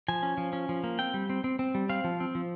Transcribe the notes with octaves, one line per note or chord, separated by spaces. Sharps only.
F3 G#5
C#4
F3
C#4
F3
A#3
C4 G5
G3
C4
C4
C4
G3
C4 F5
F3
C4
F3